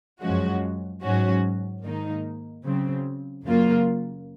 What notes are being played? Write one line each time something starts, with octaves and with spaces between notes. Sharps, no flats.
F#2 F3 G#3 C#4 F#4
G#2 F#3 C#4 F#4
G#2 D#3 A#3 D#4
C#3 F#3 C4
F#2 C#3 F#3 A#3 F4